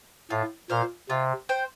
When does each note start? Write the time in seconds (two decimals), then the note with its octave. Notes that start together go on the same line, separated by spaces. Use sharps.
0.30 A2 F4
0.70 A#2 C5 F5
1.09 C3 F4
1.49 C5 G5